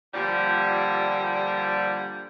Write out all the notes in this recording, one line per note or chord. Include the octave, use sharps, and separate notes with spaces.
A#2 D3 F3 G3